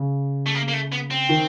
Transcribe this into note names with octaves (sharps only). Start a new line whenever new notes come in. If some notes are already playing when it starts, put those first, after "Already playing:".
Already playing: C#3
A3
A#3
A#3
A3
B3
C4
D#3